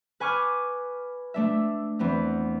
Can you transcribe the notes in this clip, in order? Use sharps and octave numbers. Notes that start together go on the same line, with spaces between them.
B4 G#5 C#6 D6 F6
A3 D4 E5
E2 B3 C4